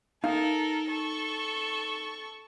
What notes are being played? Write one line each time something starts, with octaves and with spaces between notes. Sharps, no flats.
D#4 A4 A#4 F5
A4 C#6